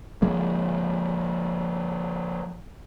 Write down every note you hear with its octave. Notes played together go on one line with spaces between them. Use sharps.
F3 G#3 A#3